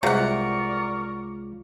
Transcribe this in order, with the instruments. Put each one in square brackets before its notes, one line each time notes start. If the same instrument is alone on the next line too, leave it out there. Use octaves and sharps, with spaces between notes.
[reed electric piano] C2 G#3 F4 [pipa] C3 F#5 [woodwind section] A#4 D5 C#6